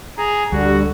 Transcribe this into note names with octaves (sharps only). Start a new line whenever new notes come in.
G#4 A#5
D2 D3 G3 F#4